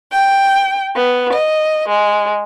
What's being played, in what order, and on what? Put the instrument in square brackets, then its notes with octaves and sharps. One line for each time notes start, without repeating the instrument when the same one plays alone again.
[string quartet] G5
B3
D#5
G#3